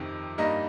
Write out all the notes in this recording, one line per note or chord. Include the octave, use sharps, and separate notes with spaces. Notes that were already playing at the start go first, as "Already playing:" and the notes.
Already playing: F2 C3 D#3
G2 G3 A#3 D#4 D#5